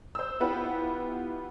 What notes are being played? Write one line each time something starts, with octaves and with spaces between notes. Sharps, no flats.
C5 E6
B3 E4 F4 G4 B4 F#5